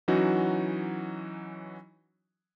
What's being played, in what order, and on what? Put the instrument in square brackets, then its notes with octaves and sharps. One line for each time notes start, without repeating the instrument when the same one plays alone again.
[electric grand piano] E3 F#3 C#4 D#4 F#4